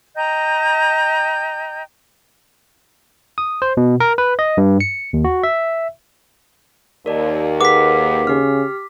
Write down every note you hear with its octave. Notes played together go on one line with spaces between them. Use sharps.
D#5 G5 A#5 G6
D#6
C5
B2
A#4
B4
D#5
G2
C#7
D#2
F#4
E5
D#2 A#4 D5 A5
G#4 B4 F#5 D6 B6
C#3 G4 F6